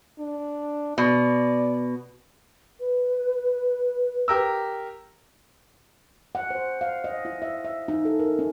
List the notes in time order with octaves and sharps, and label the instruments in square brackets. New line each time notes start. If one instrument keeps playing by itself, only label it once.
[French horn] D4
[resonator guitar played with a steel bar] B2 [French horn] D5
[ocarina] B4
[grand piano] G4 A#4 E6
[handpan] F#5
C5
F5
D#5
E4
E5
E5
D#4
A4
A#4
C#4